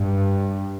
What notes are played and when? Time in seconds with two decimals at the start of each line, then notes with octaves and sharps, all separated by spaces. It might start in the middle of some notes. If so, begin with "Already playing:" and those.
Already playing: G2